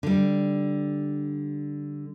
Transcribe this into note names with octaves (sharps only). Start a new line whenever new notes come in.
D3 G3